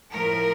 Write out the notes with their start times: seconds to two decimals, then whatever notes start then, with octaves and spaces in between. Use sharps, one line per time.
0.12 A2 F3 A3 A#4